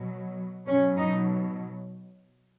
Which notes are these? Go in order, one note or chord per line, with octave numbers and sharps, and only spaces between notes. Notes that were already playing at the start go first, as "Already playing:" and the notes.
Already playing: B2 F#3
B2 F#3 C#4
D#4